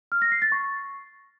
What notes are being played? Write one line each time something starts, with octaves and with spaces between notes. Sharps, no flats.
F6
A#6
C7
A6
C#6